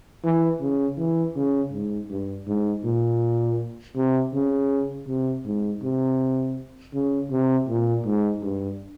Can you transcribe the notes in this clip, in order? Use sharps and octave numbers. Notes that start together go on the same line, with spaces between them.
E3
C#3
E3
C#3
G#2
G2
G#2
A#2
C3
C#3
C3
G#2
C3
C#3
C3
A#2
G#2
G2